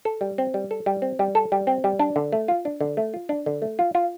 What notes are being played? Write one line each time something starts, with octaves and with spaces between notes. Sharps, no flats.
A4
G3
C4
G3
A4
G3
C4
G3
A4
G3
C4
G3
D4
D3
A3
F4
D4
D3
A3
F4
D4
D3
A3
F4
F4